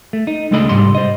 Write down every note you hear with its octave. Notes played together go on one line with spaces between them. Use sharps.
A3
D#4
C#2 G#3 A3 D4 D#5 B5
C2 F2 G#2 G3 C6
C5 D#5